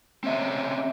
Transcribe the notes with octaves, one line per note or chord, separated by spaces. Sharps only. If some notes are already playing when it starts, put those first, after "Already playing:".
C4 C#4 E5